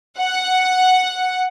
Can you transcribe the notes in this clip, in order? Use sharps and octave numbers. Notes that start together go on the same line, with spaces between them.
F#5